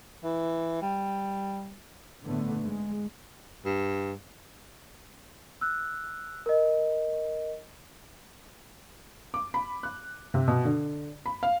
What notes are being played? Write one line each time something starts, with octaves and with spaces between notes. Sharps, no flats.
E3
G3
A2 D3 A3 B3
G#2 G#3
G2
E6 F#6
A#4 D#5
D6
B5
F#6
C3
B2
D3
B5
F5